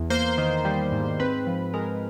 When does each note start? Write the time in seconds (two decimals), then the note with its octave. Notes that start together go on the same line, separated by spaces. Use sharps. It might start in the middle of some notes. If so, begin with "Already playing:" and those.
Already playing: E2
0.10 A#3 C5
0.38 D#3
0.65 G3
0.92 G#2
1.20 C4 B4
1.47 F3
1.74 G#3 A#4